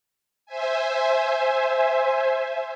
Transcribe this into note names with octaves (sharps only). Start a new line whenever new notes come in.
C5 E5 G#5